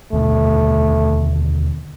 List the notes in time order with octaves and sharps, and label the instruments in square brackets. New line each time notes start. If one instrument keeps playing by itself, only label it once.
[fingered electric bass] D#2 B2 D3 [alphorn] A3